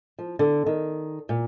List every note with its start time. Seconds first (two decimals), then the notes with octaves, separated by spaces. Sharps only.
0.19 F3
0.39 D3
0.66 D#3
1.29 A#2